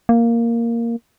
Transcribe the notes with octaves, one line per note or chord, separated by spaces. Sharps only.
A#3